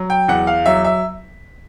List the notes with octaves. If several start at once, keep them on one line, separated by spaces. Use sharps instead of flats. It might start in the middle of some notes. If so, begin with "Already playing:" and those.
Already playing: F#3
G5
E2 F#5
F5
F#3 E5
E5